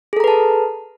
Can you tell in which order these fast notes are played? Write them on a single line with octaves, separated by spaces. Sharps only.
G#4 A4 A#5 B4 A5